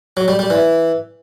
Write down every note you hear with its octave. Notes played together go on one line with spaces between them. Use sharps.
F#3
G3
G3
E3